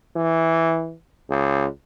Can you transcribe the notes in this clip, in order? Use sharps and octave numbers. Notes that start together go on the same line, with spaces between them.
E3
C#2